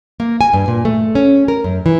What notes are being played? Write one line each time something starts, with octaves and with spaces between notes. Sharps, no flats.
A#3
G#5
G2
A#2
A3
C#4
A#4
F#2
E3